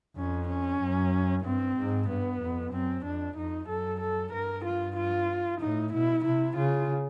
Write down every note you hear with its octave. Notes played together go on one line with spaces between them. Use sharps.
F2 C#4
C#4
F#2
G2 C4
G#2
G2 B3
F2
F#2 C4
F2 D4
F2 D#4
F#2 A4
A4
G2 A#4
F4
F4
A2 D#4
B2 E4
C3 E4
C#3 F4